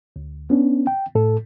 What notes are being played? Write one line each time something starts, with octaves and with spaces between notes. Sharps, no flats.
D2
B3 C#4 D4
G5
A2 A4